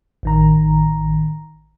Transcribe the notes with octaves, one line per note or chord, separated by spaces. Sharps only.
A1 D#3 A#5